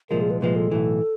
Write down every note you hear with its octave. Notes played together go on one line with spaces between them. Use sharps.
C2 A#2 F3 G#3 A#4
G#4
B4
C2 A#2 F3 G#3 B4
A4
B1 A2 E3